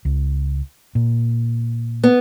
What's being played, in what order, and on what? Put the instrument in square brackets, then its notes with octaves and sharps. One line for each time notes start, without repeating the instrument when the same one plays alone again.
[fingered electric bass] C#2
A#2
[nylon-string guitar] B3